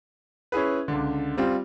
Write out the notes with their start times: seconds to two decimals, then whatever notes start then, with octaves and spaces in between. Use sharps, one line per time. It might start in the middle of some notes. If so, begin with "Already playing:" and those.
0.52 C#4 E4 G#4 B4
0.88 C#2 D3
1.37 G3 C4 F4